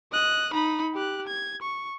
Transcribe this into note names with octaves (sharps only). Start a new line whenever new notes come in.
D#5 F#6
D#4 B5
G4 F#6
G#6
C#6